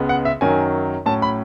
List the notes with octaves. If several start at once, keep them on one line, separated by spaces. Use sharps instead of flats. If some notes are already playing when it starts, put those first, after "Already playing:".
Already playing: C#2 C#3 G#3 B3
F#5
E5
F#2 D#3 F#3 C#4 G#5
A2 F#3 C#4 A5
B5